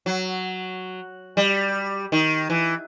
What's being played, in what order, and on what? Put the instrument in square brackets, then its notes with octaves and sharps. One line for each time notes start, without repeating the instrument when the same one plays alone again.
[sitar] F#3
G3
D#3
E3